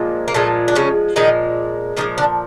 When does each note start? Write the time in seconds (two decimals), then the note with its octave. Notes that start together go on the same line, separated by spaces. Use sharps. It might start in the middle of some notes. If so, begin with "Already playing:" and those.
Already playing: A#2 F3 G#3
0.28 A#3
0.34 A#2 F3 G#3 A3
0.68 D4
0.75 C#3 C#4
1.16 A#2 D#3 F3 G#3 D#4
1.96 A#2 D#3 F3 G#3 D#4
2.18 D3 D4